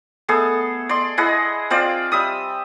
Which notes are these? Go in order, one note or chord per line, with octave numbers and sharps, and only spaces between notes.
A3 B3 G#4 A4
D5 C6
E4 G#4 D#5 F#5
C4 F4 D5 F5
G3 E5 D#6